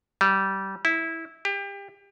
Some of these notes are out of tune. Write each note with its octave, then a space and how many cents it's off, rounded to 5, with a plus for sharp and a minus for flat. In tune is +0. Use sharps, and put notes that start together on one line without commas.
G3 -20
E4 -15
G4 +30